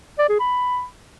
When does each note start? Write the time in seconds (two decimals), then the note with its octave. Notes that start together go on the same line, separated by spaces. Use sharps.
0.18 D5
0.29 G#4
0.40 B5